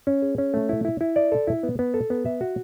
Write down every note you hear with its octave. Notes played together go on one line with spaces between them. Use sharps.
C#4
G#4
C#4
A3
E4
E4
E4
D5
A4
E4
B3
B3
A4
B3
E5
F#4